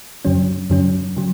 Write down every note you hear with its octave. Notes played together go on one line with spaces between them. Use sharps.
F#2 C#3 F#3 C#4
F#2 C#3 F#3 C#4
C#3 F#3